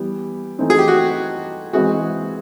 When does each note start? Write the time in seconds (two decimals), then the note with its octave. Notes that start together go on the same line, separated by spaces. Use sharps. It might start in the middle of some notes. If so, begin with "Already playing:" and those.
Already playing: E3 G3 B3 G4
0.59 E3 A3 C4 D#4
0.70 G#4
0.79 G4
0.88 F#4
1.73 E3 G#3 C4 E4 F#4 G#4